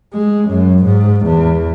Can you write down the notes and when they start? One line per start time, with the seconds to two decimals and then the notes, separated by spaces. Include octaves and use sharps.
0.14 G#3
0.49 F#2
0.85 G#2
1.26 E2